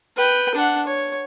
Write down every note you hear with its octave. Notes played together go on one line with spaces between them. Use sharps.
B4 G5
D4 F#5
C#5